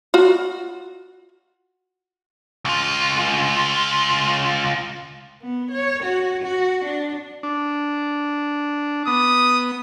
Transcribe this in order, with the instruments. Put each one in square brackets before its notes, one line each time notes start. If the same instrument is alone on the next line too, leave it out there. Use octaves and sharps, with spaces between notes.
[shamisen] F4 F#4
[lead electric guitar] C#2 F4
[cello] B3
C#5
F#4
F#4
D4
[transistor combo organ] D4
[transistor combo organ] B3 [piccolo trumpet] D#6